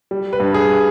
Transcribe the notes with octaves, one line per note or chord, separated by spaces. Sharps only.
G3
B4
G2
G#4